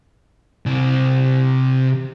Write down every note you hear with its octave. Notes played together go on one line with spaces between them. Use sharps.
C3 D5